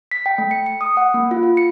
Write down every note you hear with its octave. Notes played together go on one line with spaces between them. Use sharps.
B6
G5
A3
C#7
C#7
D#6
F#5
A#3
F4
F4
C#7